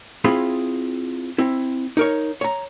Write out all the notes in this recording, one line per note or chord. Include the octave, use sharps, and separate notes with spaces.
C4 E4 F4 G#4 B5
C4 E4
D#4 A#4 C#5
C#5 A#5